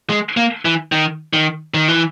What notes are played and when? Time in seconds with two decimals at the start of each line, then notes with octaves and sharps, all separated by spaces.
0.10 G#3
0.37 A#3
0.65 E3
0.92 D#3
1.33 D#3
1.74 D#3
1.88 E3